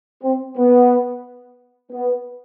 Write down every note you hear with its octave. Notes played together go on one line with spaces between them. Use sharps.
C4
B3
B3